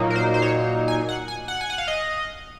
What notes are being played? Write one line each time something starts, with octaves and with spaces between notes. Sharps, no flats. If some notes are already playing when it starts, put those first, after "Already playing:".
Already playing: A#2 F#3 A#3 D#4
A#4
C5
C5
C#5
G#5
F#5
G#5
F#5
G#5
F#5
F5
D#5